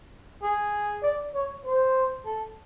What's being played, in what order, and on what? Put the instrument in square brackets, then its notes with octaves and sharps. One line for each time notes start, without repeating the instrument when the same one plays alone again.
[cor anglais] G#4
[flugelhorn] D5
C#5
C5
[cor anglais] A4